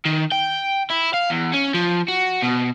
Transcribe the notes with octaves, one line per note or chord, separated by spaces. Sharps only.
D#3
G5
E4
F5
E2
C#4
F3
F#4
B2